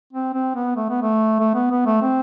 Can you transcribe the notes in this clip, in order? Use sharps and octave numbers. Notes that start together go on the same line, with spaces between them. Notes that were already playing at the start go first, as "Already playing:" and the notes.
C4
C4
B3
A3
B3
A3
A3
B3
B3
A3
C4